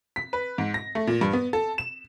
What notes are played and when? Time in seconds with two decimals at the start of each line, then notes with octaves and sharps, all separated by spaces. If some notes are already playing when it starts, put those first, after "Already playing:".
0.16 B6
0.33 B4
0.58 G#2
0.74 A#6
0.95 A3
1.07 A#2
1.21 G2
1.33 B3
1.53 A4
1.78 E7